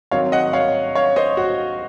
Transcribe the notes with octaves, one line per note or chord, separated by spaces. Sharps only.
D#3 F#3 C4 C#5 F5
D#5 F#5
C#5 F5
C#5 F5
C5 D#5
F#4